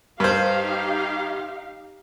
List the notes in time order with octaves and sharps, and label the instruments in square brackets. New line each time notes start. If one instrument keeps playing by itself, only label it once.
[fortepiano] G2 C5 [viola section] D#4 G4 F5